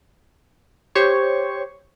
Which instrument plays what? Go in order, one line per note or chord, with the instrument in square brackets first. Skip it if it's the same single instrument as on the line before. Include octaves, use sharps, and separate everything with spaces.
[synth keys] G4 C5 C#5 C#6